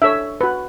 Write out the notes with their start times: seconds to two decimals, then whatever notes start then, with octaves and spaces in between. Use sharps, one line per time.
0.02 D4 A4 C#5 E5
0.41 F#4 B4